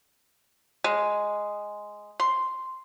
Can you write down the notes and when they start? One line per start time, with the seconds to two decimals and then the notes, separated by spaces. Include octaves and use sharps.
0.84 G#3
2.20 C6